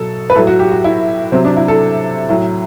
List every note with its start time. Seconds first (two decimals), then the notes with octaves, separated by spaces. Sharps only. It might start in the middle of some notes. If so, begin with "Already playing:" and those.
Already playing: B2 F#3 A4
0.30 B4
0.35 A2 F#3 A4
0.47 F#4
0.59 G4
0.71 F#4
0.84 E4
1.32 C3 F#3 C4
1.45 D4
1.57 E4
1.68 A4
2.29 A2 F#3